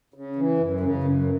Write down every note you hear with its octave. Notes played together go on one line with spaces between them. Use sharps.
C#3
E3
F#2
C#3
F#2